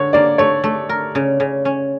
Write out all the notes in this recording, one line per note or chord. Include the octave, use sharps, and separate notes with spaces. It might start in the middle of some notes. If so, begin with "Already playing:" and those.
Already playing: D3 C#5
A#3 D5
A3 C#5
A3
A#4
C#3
C#3
C#4